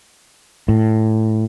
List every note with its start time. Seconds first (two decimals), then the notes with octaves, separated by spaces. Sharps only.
0.69 A2